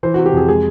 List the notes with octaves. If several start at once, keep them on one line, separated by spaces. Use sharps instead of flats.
E3 C5
F#4
C3
G4
F2 G#4
G#3 G#4